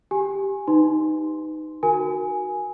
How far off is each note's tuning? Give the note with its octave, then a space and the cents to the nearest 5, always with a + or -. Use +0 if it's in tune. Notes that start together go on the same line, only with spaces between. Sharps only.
G4 +0 G#5 +0
D#4 +0 B4 +25 C6 +0
F#4 +0 A#4 +0 G#5 +0